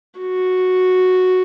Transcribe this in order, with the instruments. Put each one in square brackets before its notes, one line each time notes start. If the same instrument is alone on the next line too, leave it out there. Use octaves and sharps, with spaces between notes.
[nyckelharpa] F#4